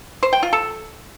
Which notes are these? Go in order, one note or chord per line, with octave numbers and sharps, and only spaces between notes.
C5
G5
F4
A4